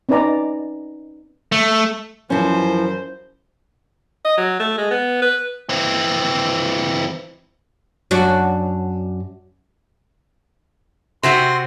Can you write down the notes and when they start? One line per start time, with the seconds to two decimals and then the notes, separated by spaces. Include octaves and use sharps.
0.09 C4 C#4 D#4 B4 D5 A#5
1.52 A3
2.30 F#2 E3 F3 C#4 C5
4.25 D#5
4.38 F#3
4.60 A3
4.78 G#3
4.91 B3
5.22 B4
5.69 E3 C4
8.11 F#2 D4 F#4
11.23 C3 C4 F#4 C6